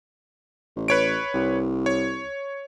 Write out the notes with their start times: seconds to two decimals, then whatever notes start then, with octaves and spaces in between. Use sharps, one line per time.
0.77 A1
0.88 B4 C#5 D7
1.34 C2
1.86 C#5